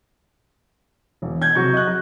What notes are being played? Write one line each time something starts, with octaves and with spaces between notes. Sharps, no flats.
E1
G6 G#6
C3 F#3 F#4 C#6
D#5 F#6
F#3